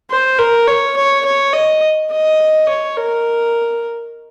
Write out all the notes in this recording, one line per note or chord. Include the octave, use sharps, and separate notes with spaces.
C5
A#4
C#5
C#5
C#5
D#5
D#5
C#5
A#4